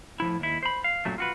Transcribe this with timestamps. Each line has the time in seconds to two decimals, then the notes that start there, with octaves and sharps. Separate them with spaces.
0.20 A2 F3 E4
0.40 D#2 E4
0.63 C5 B5
0.84 F5
1.05 F#2 A#2 F#3 A3
1.18 F4 F#4 B4